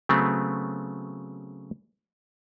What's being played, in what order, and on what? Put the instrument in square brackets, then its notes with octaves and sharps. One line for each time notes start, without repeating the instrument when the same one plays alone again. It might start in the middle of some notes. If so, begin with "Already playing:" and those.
[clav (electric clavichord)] C#3 F#3 A3 B3 C4